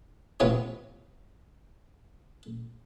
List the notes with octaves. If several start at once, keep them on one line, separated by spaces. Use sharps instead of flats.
A1 C3 B3 C4 F4 C#5